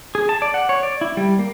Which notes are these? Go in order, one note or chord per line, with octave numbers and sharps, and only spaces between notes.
G#4
A5
D5
F#5
C#5
D5
E4
G3
A#3